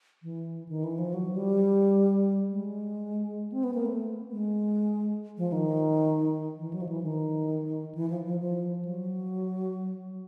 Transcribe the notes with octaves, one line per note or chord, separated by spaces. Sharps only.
E3
D#3
E3
F3
F#3
G3
G#3
C4
B3
A#3
A3
G#3
F3
D#3
E3
F#3
F3
E3
D#3
E3
F3
F3
F3
F#3